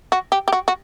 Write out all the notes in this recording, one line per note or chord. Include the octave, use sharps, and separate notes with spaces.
F#4
G4
G4
F#4
F#4